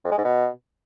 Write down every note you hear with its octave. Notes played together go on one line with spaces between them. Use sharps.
F2
G#3
G#2
B2